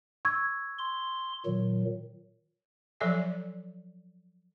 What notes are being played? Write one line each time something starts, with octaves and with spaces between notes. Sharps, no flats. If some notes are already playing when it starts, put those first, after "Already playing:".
C#6 E6 G#6
C6
A#2 D#3 F#3
F3 F#3 A4 D5 E5 G#5